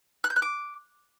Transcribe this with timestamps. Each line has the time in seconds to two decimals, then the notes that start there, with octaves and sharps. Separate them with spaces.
0.24 F#6
0.30 G6
0.36 F#6
0.42 D6